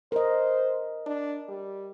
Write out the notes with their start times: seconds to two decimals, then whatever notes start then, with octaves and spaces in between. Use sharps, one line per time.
0.12 A#4 C5 D#5
1.06 D4
1.49 G3